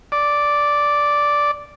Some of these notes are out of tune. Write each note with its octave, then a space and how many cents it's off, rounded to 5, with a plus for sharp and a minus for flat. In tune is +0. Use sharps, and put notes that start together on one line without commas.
D5 -5